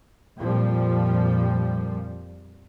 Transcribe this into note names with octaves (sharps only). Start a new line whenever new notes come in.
F2 A#2 F3 G3